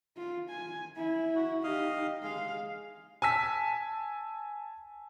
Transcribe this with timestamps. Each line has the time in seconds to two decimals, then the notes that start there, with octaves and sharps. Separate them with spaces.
0.17 F4
0.50 G#5
0.96 E4
1.36 F#4
1.64 D#4 G4 D#5 F5
2.23 G#3 F5
3.22 G#5 A5 E6 B6